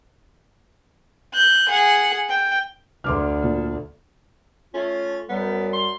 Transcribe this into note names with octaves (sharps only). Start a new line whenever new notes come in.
F#6 G6
G#4 F#5
G5
D2 C6 D6 F6
A#2
A3 C#4 F4
F#2 G3 B3
C6